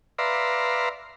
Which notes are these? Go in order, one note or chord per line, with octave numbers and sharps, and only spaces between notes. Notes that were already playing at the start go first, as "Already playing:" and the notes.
B4 D5 E5 F5 A#5 C6